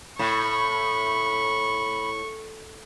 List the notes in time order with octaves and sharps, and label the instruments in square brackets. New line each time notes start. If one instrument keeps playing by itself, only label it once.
[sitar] A2 [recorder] B5 [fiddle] C#6